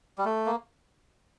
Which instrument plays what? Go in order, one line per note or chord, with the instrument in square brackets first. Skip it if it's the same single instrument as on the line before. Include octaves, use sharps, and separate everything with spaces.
[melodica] G3
A3
A#3